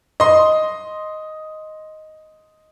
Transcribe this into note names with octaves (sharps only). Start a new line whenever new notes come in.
D#5 C6